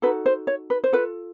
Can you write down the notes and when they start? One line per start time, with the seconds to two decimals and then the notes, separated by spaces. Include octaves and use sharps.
0.02 D#4 F#4 A4 B4
0.26 C5
0.47 C#5
0.70 B4
0.84 C5
0.93 F4 A4 B4